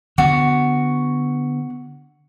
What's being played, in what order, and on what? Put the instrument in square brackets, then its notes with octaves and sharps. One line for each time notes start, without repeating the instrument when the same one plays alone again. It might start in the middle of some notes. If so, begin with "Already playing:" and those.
[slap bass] D3 B3 [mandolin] F#4